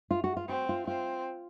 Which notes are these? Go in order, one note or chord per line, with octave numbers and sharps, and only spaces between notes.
F4
F#4
F4
C4 F#4
F4
C4 F4